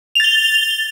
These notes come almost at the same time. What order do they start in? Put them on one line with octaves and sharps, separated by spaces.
F7 A6 G7